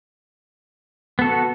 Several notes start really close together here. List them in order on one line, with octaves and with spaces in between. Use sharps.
B3 A4 F#4